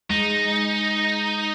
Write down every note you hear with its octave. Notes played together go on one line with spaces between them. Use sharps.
G#3 D#4